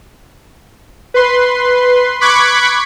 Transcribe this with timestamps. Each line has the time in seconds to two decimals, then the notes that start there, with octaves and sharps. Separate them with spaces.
1.14 B4 C6
2.21 B5 C#6 D6 F#6 G#6 B6